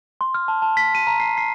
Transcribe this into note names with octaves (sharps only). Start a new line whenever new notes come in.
C6
F6
A5
A5
B6
D#7
A#5
C7
C7